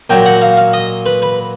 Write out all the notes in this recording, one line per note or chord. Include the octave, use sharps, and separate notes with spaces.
A#2 F#3 G5
F#5
F5
F5
D#5
B4
B4